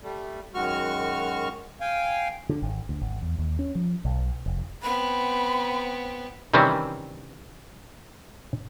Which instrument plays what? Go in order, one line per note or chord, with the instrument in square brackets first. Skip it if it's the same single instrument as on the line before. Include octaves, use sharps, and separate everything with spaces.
[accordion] G3 A3
F#2 D#3 G#3 F#4 C#6 F6
F5 G5 G#5
[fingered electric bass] D3
G#1
D2
G#1
E2
D#2
C#4
F3
B1
F1
[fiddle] B3 C4 [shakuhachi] B5
[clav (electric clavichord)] C3 D#3 E3 G3 C4 C#4